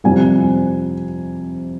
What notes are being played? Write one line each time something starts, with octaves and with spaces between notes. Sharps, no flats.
F2 C3 G3 G#5